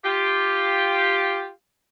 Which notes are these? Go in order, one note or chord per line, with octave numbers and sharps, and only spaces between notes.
F4 G4